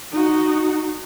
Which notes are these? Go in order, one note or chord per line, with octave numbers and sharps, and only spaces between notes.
D#4 F#4